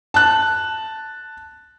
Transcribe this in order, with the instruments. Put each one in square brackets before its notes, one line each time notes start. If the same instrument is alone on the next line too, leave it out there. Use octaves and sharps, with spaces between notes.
[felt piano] A5 F#6